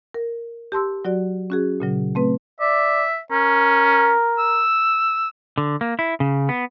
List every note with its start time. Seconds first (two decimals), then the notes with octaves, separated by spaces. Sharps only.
0.14 A#4
0.72 G4 A5 C6 E6
1.05 F#3 F#4 D5
1.50 C#4 F#4 G#4
1.80 A#2 C#3 F#3
2.15 A3 C4 B4
2.60 D5 E5
3.31 C#4 A#4
4.39 E6
5.58 D3
5.81 A#3
5.99 E4
6.20 C#3
6.49 B3